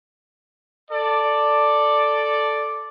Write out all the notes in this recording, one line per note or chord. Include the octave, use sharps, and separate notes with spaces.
A4 D5